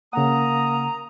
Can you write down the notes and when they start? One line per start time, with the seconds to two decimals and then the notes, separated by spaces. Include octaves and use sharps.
0.13 C#3 A#3 F#5 A#5 D#6